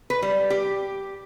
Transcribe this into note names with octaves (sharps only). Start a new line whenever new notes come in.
B4
G3
G4